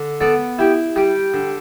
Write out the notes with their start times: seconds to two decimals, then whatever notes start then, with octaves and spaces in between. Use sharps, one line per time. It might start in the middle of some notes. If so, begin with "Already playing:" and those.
Already playing: D3
0.21 B3 A4 D5
0.59 E4 G4
0.96 G3 G4
1.34 D3